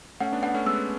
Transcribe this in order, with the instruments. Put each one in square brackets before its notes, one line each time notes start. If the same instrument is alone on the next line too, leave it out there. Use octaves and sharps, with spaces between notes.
[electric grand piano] A3 C#4 [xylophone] F#5
[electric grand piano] B3 D4
[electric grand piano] B3 D4 [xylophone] F#5
[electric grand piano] A3 C#4
[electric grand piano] G#3 B3 [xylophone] E6